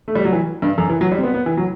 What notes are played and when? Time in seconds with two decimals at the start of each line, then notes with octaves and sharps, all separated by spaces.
0.08 A3
0.15 G3
0.25 F#3
0.32 E3
0.62 G2
0.78 F#2
0.90 E3
1.01 F#3
1.12 G3
1.18 C4
1.24 B3
1.34 B3
1.46 E3
1.57 F#3